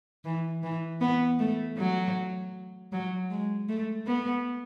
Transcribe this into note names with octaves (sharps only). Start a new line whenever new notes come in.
E3
E3
B3
A3
F#3
F#3
G#3
A3
B3